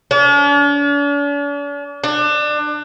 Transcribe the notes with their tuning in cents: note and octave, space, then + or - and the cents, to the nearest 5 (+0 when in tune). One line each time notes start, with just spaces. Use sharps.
D4 -45
D4 +25